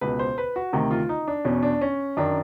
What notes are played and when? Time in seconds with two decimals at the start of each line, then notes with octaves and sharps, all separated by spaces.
0.01 C#2 B2 B4
0.19 C5
0.38 B4
0.56 F#4
0.73 D2 C3 D#3
0.91 F4
1.09 D#4
1.28 D4
1.45 E2 B2 C#4
1.63 D4
1.81 C#4
2.17 F#2 D#3 D4